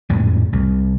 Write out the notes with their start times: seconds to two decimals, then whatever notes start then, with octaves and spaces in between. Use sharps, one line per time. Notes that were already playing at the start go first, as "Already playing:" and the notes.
0.09 A#1 F2 A2 G#3
0.53 C2